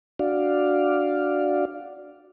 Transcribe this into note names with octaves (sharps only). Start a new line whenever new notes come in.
D4 F#4 D5 F5